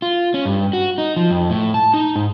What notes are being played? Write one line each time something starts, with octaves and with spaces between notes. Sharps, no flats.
F4
C#4
G2
F#4
D#4
F3
F2
A2
A5
D#4
G#2